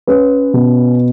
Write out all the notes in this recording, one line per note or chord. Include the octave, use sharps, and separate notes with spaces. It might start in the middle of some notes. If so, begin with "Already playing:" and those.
C#4 B4
B2